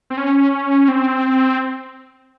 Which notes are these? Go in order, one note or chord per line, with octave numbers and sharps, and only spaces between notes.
C4
C#4
C4